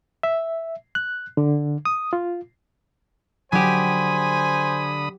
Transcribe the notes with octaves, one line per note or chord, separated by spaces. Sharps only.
E5
F#6
D3
D#6
F4
D3 F#3 G4 C5 G#5 B5 D#6